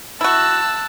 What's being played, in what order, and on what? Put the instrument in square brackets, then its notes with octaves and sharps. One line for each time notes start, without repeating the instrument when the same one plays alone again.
[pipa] E4 F#4 [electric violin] A5 [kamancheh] E6 F#6